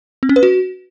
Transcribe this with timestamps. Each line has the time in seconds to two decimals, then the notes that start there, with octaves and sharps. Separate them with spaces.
0.23 C4
0.29 C#4
0.36 B4
0.43 F#4